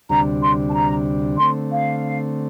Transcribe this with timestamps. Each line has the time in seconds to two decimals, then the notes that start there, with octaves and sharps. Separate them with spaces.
0.09 D2 C3 G3 D4 A#5
0.41 C6
0.69 A5
0.74 A#5
1.37 D3 A3 C4 C6
1.71 F5